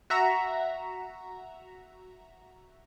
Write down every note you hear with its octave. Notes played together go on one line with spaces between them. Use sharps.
F#4 E5 A#5